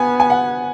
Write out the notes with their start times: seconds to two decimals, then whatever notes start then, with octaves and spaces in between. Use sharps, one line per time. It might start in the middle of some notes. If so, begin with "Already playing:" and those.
Already playing: B3 G#5
0.20 G#5
0.30 F#5